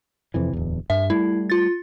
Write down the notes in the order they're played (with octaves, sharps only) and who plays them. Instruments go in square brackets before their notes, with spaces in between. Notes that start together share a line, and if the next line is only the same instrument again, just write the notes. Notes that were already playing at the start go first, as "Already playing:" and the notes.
[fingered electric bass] F2 C3 E3
D1 E2
[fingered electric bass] G2 [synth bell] E5
[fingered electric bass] G3 A3 [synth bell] E4
[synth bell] F4 A6